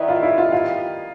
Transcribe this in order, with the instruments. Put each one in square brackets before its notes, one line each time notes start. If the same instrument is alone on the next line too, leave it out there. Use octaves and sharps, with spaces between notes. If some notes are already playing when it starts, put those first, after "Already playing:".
Already playing: [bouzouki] D#3 G3 B3 D#4 [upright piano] E4
[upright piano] F4
E4
F4
F4